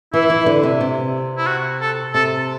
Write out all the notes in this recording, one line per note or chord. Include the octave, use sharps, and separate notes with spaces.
E3 E4
E3
D3
C3
C3
E4
F#4
A4
C3 A4